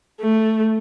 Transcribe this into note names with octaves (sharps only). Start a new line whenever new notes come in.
A3